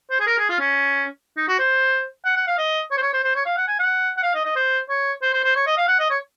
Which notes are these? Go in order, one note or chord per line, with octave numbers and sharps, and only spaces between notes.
C5
G#4
A#4
G#4
F4
C#4
D#4
F#4
C5
F#5
F#5
F5
D#5
C#5
C5
C#5
C5
C5
C#5
F5
F#5
G#5
F#5
F#5
F5
D#5
D#5
C5
C#5
C5
C5
C5
C#5
D#5
F5
F#5
D#5
C#5